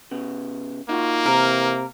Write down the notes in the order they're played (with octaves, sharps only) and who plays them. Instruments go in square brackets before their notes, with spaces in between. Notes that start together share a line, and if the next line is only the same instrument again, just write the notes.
[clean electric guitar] C#3 B3
[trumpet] A#3 [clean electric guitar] D#4 F4 F#4
[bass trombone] C3 [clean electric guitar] E3 [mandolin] A#4